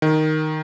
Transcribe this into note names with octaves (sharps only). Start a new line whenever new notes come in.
D#3